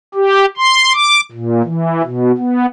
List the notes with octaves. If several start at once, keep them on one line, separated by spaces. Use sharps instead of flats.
G4
C6
D6
A#2
E3
B2
B3